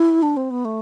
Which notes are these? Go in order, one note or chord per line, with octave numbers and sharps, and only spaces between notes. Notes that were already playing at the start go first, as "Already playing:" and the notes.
Already playing: E4
D4
C4
B3
A3